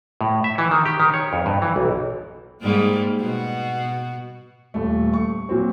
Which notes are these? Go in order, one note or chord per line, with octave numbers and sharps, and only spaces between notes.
A2
E5
E3
D#3
G4
D#3
C#5
F2
G2
E3
B1
G#2 G3 A#3
B2 F#4
D#1 A3
C#6
A#2 F#3 C4